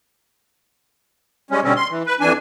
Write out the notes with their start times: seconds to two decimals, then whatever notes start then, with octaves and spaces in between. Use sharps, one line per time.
1.51 G3 G#3 C#4
1.63 B2 D3 G3 C4 C#4
1.76 C6
1.90 E3
2.06 B4
2.20 F2 E3 D4 G#5